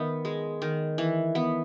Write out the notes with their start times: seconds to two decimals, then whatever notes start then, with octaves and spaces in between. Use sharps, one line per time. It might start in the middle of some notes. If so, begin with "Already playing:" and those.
Already playing: D#3 B3 E5
0.25 G#3
0.62 D#3
0.98 E3
1.35 B3